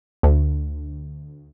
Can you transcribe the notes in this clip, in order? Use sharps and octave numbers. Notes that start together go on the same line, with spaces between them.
D2